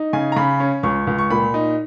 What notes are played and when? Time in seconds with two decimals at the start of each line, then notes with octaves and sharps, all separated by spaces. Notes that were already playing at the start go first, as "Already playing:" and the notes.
Already playing: D#4
0.13 C#3 G#5
0.32 A#5
0.36 C#3 B5
0.60 C#4
0.83 C#2 C#6
1.07 C#2
1.19 C#6
1.30 A#2 B5
1.54 D#4